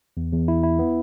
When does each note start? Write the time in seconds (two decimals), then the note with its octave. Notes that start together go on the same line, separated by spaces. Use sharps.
0.17 E2
0.32 E2
0.48 E4
0.63 E4
0.79 B3